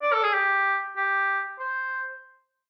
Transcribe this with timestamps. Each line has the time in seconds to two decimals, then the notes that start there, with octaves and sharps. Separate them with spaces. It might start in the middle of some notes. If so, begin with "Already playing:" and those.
0.02 D5
0.13 A4
0.23 G#4
0.34 G4
0.97 G4
1.59 C5